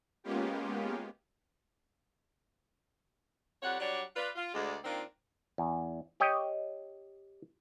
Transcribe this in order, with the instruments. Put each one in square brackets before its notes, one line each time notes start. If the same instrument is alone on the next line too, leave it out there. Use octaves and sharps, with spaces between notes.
[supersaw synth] G#3 A#3 B3 C#4 F4 G4
[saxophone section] F2 G3 C#5 F#5
F#3 G3 D4 C#5 D5 F#5
F4 B4 D5
F4
D2 G#3 D5
D#3 A#3 C4 D4 F4
[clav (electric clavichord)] E2
G4 C#5 D#5 G5